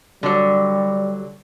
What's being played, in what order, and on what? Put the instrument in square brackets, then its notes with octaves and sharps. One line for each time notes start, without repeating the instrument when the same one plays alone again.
[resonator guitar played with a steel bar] D3 F#3 [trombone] G3